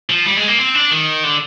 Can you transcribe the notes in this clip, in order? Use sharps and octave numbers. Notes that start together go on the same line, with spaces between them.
F3
G3
G#3
A#3
C4
D4
D#3
D3